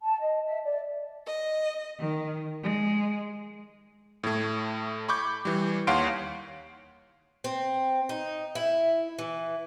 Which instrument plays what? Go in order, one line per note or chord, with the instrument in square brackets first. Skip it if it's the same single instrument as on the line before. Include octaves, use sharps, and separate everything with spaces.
[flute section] A5
D#5
E5
D5
[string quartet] D#5
D#3
G#3
[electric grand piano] A2 A3
B5 C#6 D6 G6
E3 G3
D#2 C#5 F5 F#5 C6 D7
[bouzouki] C4
D#4
E4
E3